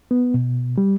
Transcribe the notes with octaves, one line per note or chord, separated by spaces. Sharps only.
B3
B2
G3